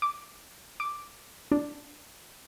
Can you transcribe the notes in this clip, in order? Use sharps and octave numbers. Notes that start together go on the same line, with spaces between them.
D6
D6
D4